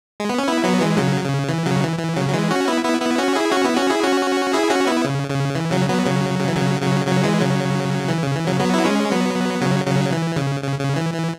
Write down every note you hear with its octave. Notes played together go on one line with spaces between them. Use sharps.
G#3
B3
C#4
B3 E4
F#3 B3
E3 G#3
C#3 F#3
C#3
E3
C#3 F#3
E3
E3
C#3 F#3
F#3
E3 G#3
C#4 F#4
B3 E4
B3 E4
B3 E4
C#4 F#4
E4 G#4
C#4 F#4
B3 E4
C#4 F#4
E4 G#4
C#4 F#4
E4 G#4
C#4 F#4
B3 E4
C#3
C#3
E3
C#3 F#3
F#3 B3
C#3 F#3
C#3
E3
C#3 F#3
C#3 F#3
C#3 F#3
E3 G#3
C#3 F#3
E3
C#3
E3
C#3 F#3
F#3 B3
E4
G#3 C#4
F#3 B3
C#3 F#3
C#3 F#3
E3
C#3
C#3
C#3
E3
E3